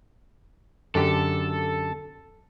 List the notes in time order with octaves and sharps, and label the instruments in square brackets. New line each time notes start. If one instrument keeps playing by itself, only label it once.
[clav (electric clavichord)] F#2 D3 G4 [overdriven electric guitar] A4